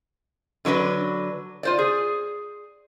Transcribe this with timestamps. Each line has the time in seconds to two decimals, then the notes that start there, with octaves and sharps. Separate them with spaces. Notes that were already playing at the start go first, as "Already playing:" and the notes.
0.65 D3 F#3 D4 B4
1.63 F4 C5 D5
1.79 G#4